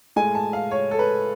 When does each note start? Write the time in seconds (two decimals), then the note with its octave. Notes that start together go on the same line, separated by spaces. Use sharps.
0.16 A2 G#3 G#5
0.35 A5
0.53 F5
0.71 C#5
0.91 A4
0.99 B4